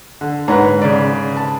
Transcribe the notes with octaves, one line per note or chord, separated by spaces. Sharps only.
D3
G#2 B4 C#5 F#5 A#5
C#3 D5
A5